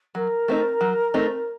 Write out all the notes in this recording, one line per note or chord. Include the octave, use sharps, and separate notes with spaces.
F#3 A#4
A3 C4 D#4
F#3
A3 C4 D#4